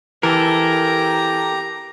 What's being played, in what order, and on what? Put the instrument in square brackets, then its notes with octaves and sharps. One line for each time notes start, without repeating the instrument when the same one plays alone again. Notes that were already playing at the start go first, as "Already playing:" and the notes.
[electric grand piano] E3 [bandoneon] G4 [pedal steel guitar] A4 A#4 [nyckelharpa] A#5